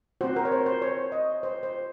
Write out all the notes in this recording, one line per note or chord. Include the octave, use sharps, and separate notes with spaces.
C4 F#4 C5
A#4
C#5
C5
C5
C#5
D#5
C5
C5